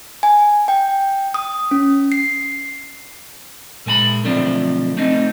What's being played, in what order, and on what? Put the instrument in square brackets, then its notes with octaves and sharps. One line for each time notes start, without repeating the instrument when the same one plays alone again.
[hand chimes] G#5
G5
D#6
C#4
C7
[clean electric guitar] A#2 G#3 G#5 B5
B1 D3 F3 A3 C4 D5
A3 C4 D#4